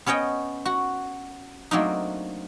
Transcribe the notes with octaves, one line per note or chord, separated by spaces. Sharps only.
B3 C#4 C#5 D#5 G5
F#4
F#3 A3 A#3 C4 D4 D#4